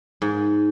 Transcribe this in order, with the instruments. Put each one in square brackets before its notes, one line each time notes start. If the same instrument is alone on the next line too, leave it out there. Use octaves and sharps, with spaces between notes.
[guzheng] G#2